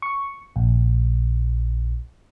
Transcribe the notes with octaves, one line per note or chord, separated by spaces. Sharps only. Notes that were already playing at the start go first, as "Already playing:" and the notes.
C#6
A#1